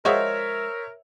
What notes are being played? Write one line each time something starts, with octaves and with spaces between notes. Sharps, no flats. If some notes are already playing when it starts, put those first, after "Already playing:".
F3 G#3 F#4 A#4 C5 C#5 E5